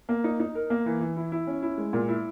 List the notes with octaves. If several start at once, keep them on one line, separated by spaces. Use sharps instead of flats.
A#3
D#4
D#4
A#4
A#3
E3
E3
E4
E4
C#4
E4
G#3
A#2
E4